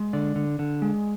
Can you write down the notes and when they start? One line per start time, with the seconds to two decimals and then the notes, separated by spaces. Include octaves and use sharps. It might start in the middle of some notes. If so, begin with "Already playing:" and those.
Already playing: G#3
0.13 D3 D5
0.36 D3
0.59 D3
0.82 G#3